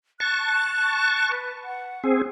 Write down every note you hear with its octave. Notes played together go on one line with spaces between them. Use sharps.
A5 C#6 F#6
B4
F#5
C4 G#4